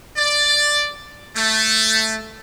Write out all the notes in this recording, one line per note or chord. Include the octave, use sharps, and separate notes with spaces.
D5
A3